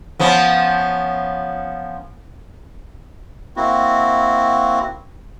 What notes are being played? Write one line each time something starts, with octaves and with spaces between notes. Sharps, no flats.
F3 B3 C#4
A#3 C4 E4 F#4